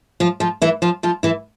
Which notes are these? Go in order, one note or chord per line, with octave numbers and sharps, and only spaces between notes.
F3 F4
F3 F4
E3 E4
F3 F4
F3 F4
E3 E4